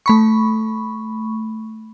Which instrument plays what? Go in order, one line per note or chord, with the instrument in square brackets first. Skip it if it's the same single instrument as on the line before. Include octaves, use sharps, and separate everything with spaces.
[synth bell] A3 B5 C#6